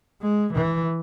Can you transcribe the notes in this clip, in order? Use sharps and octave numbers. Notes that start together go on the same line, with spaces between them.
G#3
E3